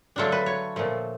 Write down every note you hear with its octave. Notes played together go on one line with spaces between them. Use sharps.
D3 F#3 A3 D4 F4 A4
B4
C#5
A#2 F3 A3